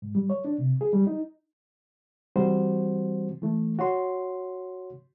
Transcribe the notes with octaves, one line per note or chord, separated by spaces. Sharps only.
G#2
G3
C#5
D4
C3
G#4
G3
D#4
E3 G3 C4 F#4 C5
E3 A3
F#4 C#5 C6